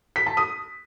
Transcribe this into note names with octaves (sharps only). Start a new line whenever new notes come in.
B6
A5
D#6